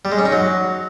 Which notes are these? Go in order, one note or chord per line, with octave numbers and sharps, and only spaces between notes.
G3
G#3
C#4
D#4
F#3